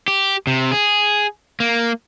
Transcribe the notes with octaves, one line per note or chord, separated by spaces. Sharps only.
G4
C3
G#4
A#3